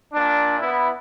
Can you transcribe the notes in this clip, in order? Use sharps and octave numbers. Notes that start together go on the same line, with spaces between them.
A#2 D4
B3 E4